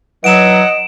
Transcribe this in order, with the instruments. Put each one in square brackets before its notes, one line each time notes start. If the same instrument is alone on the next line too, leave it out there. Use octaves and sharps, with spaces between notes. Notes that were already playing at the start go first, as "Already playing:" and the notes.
[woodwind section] E3 F#3 [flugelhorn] D#5 [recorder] F#5 [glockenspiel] D7 E7